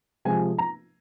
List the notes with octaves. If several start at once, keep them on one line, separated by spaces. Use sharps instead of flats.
C3 F3 G#3 C4 G#5
A#5